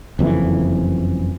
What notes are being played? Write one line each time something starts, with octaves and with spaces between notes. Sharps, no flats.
F#1 F2 B2 E3